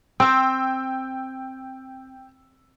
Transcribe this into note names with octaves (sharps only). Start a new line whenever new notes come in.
C4 G5 E6